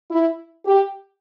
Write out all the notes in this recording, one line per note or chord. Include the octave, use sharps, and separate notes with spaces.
E4
G4